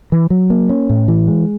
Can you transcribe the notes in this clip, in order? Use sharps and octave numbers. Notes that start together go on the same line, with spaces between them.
E3
F#3
A#3
C#4
A2
E3
G#3